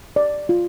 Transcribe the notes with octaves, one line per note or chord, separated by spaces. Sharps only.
D5
F4